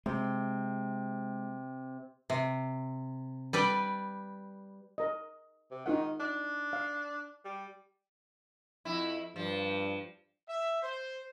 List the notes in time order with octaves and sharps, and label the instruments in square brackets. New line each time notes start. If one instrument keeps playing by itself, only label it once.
[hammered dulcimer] C3 [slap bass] G#3
[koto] C3
G3 B4 D5
[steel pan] A#4 D#5
[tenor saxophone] C3
[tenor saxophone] D#3 [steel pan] D#4 F4 F#5
[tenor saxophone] D4
[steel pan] F5
[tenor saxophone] G3
[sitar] F2 E4
[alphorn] G2 [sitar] F3
[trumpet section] E5
C5